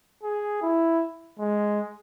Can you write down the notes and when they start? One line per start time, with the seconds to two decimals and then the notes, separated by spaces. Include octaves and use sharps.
0.23 G#4
0.62 E4
1.39 G#3